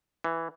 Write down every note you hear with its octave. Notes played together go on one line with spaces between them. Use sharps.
E3